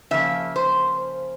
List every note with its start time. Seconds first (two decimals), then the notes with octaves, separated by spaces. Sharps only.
0.11 C#3 F3 A#3 E5
0.56 C5